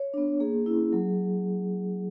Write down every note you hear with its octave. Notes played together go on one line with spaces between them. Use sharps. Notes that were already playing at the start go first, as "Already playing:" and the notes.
Already playing: C#5
B3 D4
A#3 G#4
C#4 E4
F#3